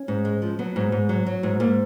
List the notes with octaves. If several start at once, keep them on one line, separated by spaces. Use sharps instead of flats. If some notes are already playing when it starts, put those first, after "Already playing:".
Already playing: C#4
G#2
G#3
F3
F#3 B3
G#2
G#2
F#3
F#3
G#2
G#2 A#3